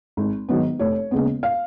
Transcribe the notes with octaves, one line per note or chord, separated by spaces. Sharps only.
G#1
G#2 D#3 F#3 B3
F1 C#5
D#2 C#3 G#3 B3
F5